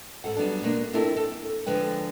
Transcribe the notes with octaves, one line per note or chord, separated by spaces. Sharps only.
G#2 A4 F#5
F#3 G3 B3 D4 A4
B2 G#3 A#3 D4
C4 D4 E4 F4 A4 A#4
A4 D#5
D3 F3 G#3 B4 G5